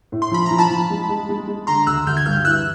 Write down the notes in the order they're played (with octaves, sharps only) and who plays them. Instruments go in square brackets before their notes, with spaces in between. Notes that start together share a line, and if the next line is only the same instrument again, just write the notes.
[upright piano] A2
[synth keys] C6
[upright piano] F3 [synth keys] B5
[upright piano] F3 [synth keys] A#5
[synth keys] A5 B5
[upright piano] F3
G#3
G#3
G#3
G#3
[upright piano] D3 [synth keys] A#5 C6
[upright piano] D2 [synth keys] E6 F#6
[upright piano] D2 [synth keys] F6 G6
[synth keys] G#6
[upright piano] G2 [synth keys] F6 G6
[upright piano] E3 [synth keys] E6 F#6